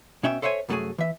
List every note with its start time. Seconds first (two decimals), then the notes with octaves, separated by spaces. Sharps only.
0.23 B2 C#4 E5 G5
0.42 A4 C5 C#5 E5 F#5 G#5
0.69 C2 F#2 A3 F#4 G#4 G#5
0.98 E3 E5